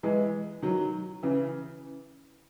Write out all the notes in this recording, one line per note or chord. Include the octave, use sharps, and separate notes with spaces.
E3 G#3
D#3 F#3
C#3 E3